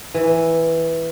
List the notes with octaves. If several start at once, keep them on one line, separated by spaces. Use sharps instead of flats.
E3